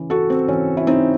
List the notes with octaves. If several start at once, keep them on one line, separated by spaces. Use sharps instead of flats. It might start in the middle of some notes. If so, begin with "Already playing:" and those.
Already playing: C#3 E3
F#4 A4
C4
C#3 E3 C#4
E4
C4 D#4